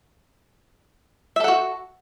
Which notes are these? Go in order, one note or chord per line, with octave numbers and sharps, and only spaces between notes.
F#4 A4 E5 F#5